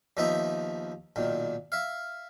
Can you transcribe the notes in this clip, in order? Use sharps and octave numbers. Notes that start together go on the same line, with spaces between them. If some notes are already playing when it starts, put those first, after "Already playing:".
D#2 F3 B3 D#4 E5
B1 A#2 D#3
E5 F5